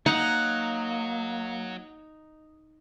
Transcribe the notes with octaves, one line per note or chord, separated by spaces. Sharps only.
F#3 A#3 D#4 F#5